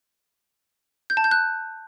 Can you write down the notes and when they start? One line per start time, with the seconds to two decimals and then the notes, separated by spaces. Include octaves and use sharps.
1.10 G6
1.17 A5
1.24 G6
1.31 F#6